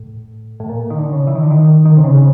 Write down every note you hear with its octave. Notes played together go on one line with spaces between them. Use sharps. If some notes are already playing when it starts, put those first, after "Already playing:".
Already playing: A2
A2
A#2
D#3
D3
C#3
E3
D#3
D3
D#3
D#3
C3
C#3
C#3